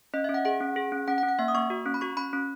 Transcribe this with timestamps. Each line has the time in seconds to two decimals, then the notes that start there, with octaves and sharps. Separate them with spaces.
0.14 C#4 D#5
0.24 C#4 E5
0.34 F#5
0.45 G#4 F#5
0.60 C#4
0.76 G#4
0.92 C#4
1.08 C#4 F#5
1.18 F#5
1.23 C#4
1.28 F#5
1.39 A#3 E5
1.48 D#6
1.55 A#3 C#6
1.70 F#4
1.86 C#4
1.94 B5
2.01 F#4 C#6
2.17 C#4 B5
2.33 C#4